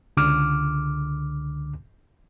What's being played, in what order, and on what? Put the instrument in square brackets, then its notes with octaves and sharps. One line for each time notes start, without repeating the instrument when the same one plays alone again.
[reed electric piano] C#2 D3 D6 F6